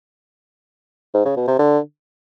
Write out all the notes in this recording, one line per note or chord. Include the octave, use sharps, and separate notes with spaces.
G#2
C#3
B2
C3
D3